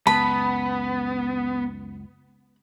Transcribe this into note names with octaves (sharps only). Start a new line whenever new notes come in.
C#2 F#2 B3 A5 B5